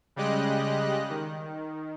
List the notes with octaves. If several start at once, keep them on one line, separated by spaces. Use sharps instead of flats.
C#3 G3 G#3 G4 D#5 F#6
D#3